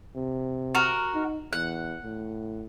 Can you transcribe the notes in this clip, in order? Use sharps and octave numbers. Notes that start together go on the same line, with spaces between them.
C3
F#4 A#4
D#4
E2 F#5
A2